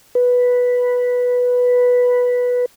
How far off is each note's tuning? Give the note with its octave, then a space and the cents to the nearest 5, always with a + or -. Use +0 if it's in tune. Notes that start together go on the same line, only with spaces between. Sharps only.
B4 -5